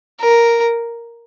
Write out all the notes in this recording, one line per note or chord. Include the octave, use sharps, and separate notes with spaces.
A#4